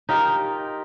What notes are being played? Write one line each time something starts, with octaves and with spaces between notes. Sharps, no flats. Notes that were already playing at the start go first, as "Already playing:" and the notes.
D#4 F4 G4 A#4